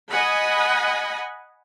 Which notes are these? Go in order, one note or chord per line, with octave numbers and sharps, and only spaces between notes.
D#5 F#5 G#5 B5